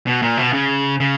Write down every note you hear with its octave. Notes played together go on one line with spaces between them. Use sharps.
B2
A#2
B2
C#3
C#3